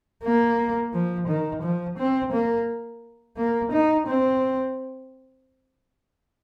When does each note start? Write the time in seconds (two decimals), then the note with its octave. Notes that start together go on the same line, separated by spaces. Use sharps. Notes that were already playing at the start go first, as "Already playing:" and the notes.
0.23 A#3
0.93 F3
1.28 D#3
1.62 F3
1.98 C4
2.32 A#3
3.37 A#3
3.72 D#4
4.07 C4